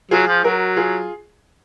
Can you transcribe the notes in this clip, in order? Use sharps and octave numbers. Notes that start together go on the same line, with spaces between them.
F#3 F4 G#4
F3
F#3 F#4 A#4
F4 G#4